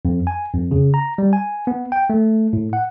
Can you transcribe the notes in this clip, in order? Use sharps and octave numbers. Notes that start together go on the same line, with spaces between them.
F2
G#5
F2
C#3
A#5
G3
G#5
B3
G5
A3
A2
F#5